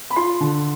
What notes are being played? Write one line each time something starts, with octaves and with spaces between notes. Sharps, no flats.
B5
F4 C6
D3